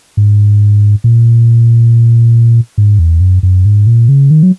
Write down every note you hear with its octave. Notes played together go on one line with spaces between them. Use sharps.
G#2
A#2
G#2
E2
F#2
F#2
G#2
A#2
C#3
D#3
F#3